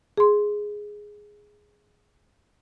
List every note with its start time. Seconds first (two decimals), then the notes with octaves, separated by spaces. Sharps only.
0.17 G#4 C6